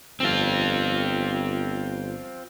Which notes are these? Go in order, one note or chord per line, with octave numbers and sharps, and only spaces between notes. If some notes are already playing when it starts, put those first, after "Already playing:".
G1 C4 F4